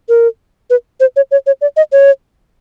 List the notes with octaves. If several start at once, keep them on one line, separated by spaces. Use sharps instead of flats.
A#4
B4
C5
C#5
C#5
C#5
D5
D#5
C#5